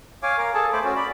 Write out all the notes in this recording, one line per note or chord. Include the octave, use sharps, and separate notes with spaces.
C#5 F5 G#5 D6
A#4 F5
G#4 A4 A5
A3 C5 B5 D6
C#4 F#4
D5 B5